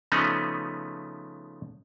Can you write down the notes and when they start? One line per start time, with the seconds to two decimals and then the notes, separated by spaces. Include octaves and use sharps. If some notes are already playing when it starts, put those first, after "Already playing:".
0.12 C#3 F3 A3 B3 C#4 D#4